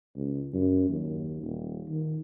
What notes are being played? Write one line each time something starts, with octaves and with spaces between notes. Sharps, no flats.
C#2
F#2
D#2
D#1
D#3